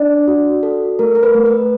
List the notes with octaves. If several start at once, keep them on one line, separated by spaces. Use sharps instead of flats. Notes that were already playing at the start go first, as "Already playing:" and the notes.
Already playing: D4 D5
F#4
A4
A3 A#4
A#4
B4
A3
B4